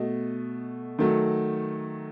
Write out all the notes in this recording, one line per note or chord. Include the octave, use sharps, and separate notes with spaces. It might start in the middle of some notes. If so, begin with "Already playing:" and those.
Already playing: B2 A3 D#5
D#3 F#3 A3